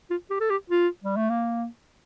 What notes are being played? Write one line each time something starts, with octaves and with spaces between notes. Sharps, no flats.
F4
G4
A4
G4
F4
G3
A3
A#3